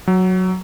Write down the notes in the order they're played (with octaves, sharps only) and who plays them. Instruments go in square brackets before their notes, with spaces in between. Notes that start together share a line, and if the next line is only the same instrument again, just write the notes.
[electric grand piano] F#3